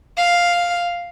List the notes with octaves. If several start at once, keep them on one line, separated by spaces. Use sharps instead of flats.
F5